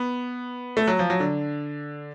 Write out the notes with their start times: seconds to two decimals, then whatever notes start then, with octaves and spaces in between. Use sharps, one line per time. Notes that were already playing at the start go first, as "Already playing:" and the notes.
Already playing: B3
0.77 A3
0.87 F#3
0.99 F3
1.10 F#3
1.20 D3